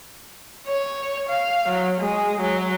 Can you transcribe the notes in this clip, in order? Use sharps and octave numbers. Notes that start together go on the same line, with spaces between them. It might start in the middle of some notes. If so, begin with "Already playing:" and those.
C#5
F5
F#3
G#3
F#3